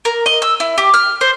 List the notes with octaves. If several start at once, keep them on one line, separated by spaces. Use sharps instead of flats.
A#4
D#5
E6
E4
G4
F6
C5